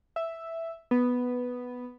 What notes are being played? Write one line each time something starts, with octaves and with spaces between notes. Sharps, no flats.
E5
B3